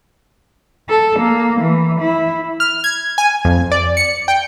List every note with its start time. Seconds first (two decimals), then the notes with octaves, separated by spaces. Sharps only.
0.89 A4
1.20 A#3
1.61 E3
2.01 E4
2.60 F6
2.84 G#6
3.18 G#5
3.45 F2
3.71 D5
3.97 C#7
4.28 G5